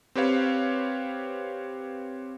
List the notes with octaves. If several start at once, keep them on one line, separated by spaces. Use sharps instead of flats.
C4 G4 B4 C#5 F5